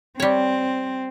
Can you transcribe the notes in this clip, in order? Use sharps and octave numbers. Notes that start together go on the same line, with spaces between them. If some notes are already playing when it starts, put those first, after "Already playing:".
G3 C4 C#5